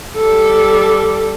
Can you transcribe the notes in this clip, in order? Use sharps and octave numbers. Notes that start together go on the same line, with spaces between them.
G3 A4